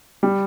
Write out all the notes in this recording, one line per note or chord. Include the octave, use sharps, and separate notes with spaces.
G3